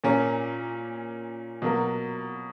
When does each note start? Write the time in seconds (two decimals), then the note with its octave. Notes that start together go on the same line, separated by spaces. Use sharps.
0.04 A#2 A#3 C#4
1.62 B2 F#3 A#3